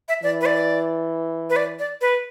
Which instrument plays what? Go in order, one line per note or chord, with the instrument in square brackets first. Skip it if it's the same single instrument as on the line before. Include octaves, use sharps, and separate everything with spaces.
[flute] E5
[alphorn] E3 [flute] D5
[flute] B4
D5
B4
D5
D5
B4